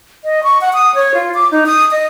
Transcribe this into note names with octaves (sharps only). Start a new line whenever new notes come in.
D#5
C#6
F#5
D#6
C#5
F4
D6
D#4
D#6
D#5